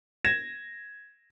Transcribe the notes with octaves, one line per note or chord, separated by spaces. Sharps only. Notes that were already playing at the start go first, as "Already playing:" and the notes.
G#6 A#6 E7